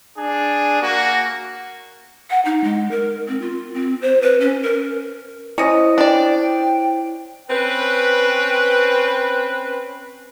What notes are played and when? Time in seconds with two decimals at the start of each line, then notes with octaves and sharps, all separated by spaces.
0.17 D4 G#4
0.82 A#3 F#4
2.30 F#5
2.45 D#4
2.64 G#3
2.91 A#4
3.28 C4
3.42 F4
3.74 C4
4.02 C5
4.22 B4
4.40 C#4
4.63 A#4
5.58 C#4 E4 C5 C#5 D#5
5.98 D4 D5 G5
7.50 C4 C#4 B4